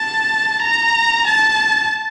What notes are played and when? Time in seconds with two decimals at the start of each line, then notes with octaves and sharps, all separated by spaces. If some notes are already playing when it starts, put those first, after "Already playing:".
Already playing: A5
0.61 A#5
1.26 A5